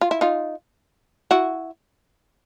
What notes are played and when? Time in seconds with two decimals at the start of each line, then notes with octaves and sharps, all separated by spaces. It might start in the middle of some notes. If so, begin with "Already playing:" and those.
0.01 F4
0.11 E4
0.21 D#4 F4
1.31 E4 F#4